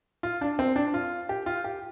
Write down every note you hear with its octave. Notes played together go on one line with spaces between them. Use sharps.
F4
D4
C4
D4
F4
G4
F4
G4